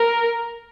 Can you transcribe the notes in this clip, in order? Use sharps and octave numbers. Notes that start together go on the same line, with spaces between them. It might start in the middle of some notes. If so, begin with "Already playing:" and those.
Already playing: A#4